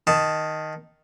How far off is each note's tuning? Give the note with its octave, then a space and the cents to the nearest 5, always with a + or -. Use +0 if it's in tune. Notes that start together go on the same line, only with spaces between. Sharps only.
D#3 +0 A5 +0